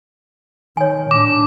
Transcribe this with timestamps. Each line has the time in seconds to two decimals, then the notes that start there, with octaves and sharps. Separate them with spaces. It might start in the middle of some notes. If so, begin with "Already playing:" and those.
0.77 D#3 C#5 G#5
1.11 A2 D4 D6